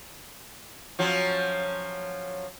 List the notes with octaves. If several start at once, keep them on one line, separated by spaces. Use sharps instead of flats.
F3 F#3 C#4